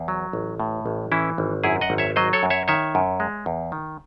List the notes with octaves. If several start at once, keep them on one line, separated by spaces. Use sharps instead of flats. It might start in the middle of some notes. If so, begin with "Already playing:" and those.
Already playing: E2
F#3
A1
A2
A1
E3 C#4 E4
G#1
F#2 E4 G#4
D#5 F#5
G#1
C#5 E5
F#3 C5 D#5
A4 C#5
F#2
C#5 E5
D#3 C#5 E5
F#2
G#3
E2
D#3